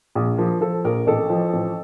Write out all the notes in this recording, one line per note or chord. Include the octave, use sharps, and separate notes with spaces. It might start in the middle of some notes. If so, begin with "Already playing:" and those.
A#1
F3 A#4
F3 A4
A#1 A#4
A1 A4
F3
A1